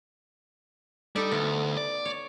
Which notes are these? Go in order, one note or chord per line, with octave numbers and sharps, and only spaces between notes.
G3 D#4 A4 D5
D2 B3
D5
C#5